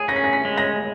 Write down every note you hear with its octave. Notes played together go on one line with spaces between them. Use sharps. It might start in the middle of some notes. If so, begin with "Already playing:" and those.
Already playing: G#4 G#6
C#4 A#6
B6
A#6
B6
G#3
A#6